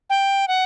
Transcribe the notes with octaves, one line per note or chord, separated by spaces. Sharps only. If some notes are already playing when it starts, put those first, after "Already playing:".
G5
F#5